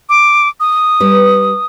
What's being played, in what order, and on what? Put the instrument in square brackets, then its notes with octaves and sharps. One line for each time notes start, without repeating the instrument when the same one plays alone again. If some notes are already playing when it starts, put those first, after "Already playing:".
[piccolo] D6
D#6
[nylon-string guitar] G3 B4